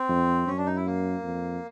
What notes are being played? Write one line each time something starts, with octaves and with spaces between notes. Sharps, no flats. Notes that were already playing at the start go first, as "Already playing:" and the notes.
Already playing: C4
F2
F#2 C#4
D4
D#4
E4
A#3
F2